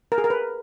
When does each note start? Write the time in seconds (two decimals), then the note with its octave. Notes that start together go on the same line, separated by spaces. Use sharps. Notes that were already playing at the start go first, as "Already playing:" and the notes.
0.12 A#4
0.18 G#4
0.24 A#4
0.30 B4